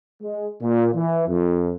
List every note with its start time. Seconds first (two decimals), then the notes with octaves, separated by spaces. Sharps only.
0.22 G#3
0.61 A#2
0.94 E3
1.28 F2